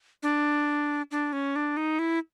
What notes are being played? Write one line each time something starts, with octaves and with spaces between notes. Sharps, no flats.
D4
D4
C#4
D4
D#4
E4